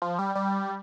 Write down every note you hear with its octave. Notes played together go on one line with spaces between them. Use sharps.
F3
G3
G3